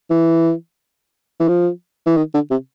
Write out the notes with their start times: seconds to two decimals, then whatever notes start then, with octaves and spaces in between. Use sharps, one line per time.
0.11 E3
1.40 E3
1.48 F3
2.06 E3
2.17 D#3
2.34 D3
2.51 C3